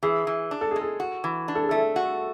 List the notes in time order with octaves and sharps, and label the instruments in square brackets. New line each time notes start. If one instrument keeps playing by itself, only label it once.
[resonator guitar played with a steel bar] E3 [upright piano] G#4
[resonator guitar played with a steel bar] E3
D4
[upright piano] A4
[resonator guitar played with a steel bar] G#3 [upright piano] G#4
[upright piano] A4
[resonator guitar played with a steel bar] F#4
E3
D4
[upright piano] A4
G#4
[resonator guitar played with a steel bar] A3 [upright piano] A4
[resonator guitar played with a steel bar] F#4